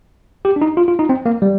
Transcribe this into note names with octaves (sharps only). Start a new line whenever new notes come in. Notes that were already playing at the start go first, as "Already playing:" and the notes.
G4
D4
D#4
F4
F4
D#4
C4
A#3
G3